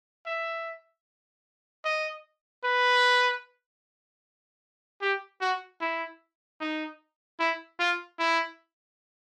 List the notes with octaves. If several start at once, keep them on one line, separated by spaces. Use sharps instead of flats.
E5
D#5
B4
G4
F#4
E4
D#4
E4
F4
E4